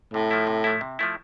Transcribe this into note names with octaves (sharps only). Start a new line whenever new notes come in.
A2 C3
F3 A3 E4
C3
F3 A3 E4
C3
F3 A3 E4